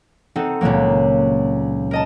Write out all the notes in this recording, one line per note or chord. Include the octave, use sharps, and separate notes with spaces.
C4 D#4 A4 F#5
C#2 A#2 D#3 F#3 A#3
A#4 D#5 A5